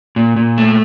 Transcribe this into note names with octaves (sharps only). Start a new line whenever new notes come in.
A#2
A#2
A3